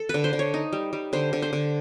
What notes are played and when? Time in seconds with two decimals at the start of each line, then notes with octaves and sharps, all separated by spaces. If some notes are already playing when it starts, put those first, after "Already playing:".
Already playing: A4
0.09 D3 B4
0.24 C5
0.33 D3
0.39 C#5
0.54 D#4
0.73 G3
0.93 G3
1.13 D3 C5
1.33 D3
1.42 C5
1.53 D3